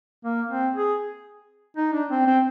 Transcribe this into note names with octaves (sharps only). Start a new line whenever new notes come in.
A#3
C4
G#4
D#4
D4
C4
C4